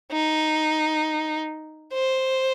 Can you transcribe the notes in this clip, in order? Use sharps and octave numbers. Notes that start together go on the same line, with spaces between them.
D#4
C5